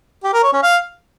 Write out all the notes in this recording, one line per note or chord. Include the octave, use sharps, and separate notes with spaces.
G4
A#4
C#5
C#4
F5